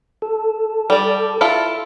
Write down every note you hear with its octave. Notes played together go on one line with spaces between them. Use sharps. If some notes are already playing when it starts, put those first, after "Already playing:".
A4
G3 D5
E4 F4 A4